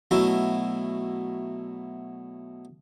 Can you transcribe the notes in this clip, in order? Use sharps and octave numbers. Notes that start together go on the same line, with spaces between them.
B2 F#3 A3 E4